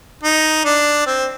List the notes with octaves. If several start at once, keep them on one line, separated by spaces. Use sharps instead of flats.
D#4
D4
C4